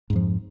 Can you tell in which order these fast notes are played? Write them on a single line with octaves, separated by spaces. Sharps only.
G#2 F2 F3